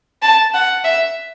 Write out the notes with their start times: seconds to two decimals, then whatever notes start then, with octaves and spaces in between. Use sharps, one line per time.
0.22 A5
0.54 F#5
0.84 E5